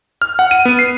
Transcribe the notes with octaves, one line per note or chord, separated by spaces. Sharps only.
F6
F#5
D#7
B3
C7